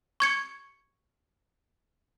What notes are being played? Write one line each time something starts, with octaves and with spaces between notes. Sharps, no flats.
C#6 G#6 C#7